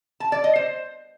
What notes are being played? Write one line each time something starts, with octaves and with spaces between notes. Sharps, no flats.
A5
D5
D#5
C5